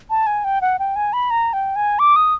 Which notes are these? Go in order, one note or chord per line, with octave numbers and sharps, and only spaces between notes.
A5
G#5
G5
F#5
G5
G#5
B5
A#5
G5
G#5
D6
D#6